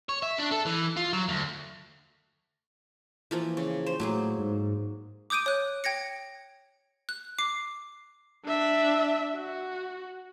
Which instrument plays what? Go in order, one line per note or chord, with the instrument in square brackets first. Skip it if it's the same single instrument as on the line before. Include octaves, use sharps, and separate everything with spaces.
[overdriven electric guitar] C#5
E5
D4
A4
E3
F4
F#3
D2
[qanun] E3 F3 A#3
C#3
C5
[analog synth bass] A2 [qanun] F#3 A#3 G#4
[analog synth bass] G#2
[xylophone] D6 D#6 G6 D7 D#7
C#5 F#6
G5 G#6 A#6 C#7
F#6
D6 C7
[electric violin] D4 E5
F#4